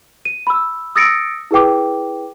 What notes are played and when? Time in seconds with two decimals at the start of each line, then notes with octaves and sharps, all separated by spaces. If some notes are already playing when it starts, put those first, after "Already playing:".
0.25 D#7
0.47 B5 E6
0.95 D#6 E6 A6 A#6 C#7 D7
1.51 E4 G#4 B4 G5 D6